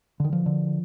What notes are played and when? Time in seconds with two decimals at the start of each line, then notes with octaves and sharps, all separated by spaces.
0.20 D3 D#3
0.33 F3
0.46 D3